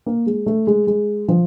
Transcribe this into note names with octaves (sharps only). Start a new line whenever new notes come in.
A#3
G#3
A3
G#3
G#3
F3